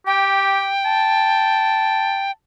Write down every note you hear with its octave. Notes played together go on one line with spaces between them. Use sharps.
G4 G5
A5